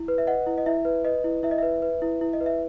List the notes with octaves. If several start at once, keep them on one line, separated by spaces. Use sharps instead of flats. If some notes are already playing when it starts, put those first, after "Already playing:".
Already playing: E4
B4
E5
B4 D#5 F#5
E4
D#5
E4 E5
B4
B4 D#5
E4
E4 E5
D#5
B4 E5
B4
E4
E4
D#5
B4
E5